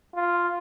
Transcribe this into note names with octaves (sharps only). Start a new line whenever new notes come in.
F4